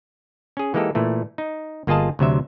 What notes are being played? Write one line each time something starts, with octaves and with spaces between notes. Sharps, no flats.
C#4 G#4
E3 G#3 A#3 D#4 G4 A4
A#2 E3 A3
D#4
G1 A#3 F4 G#4 D#5 A5
D2 C3 F#3 E5